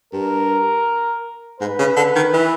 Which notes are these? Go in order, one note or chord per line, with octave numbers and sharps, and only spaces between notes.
G2 A#4
G#2 B4
C#3
D3
D#3
E3